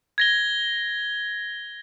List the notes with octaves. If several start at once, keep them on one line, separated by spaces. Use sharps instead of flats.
G#6 A#6 G7